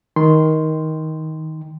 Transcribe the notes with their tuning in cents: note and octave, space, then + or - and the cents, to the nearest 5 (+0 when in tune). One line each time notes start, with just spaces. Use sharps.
D#3 +15 C6 -10